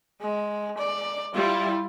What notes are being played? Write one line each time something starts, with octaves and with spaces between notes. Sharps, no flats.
G#3
D5
G3 E4 F4